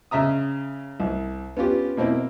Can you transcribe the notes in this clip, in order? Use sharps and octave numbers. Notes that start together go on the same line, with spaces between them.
C#3 E5 A#5 D#6
C2
B3 C#4 F4 G4
B2 A#3 C4 E4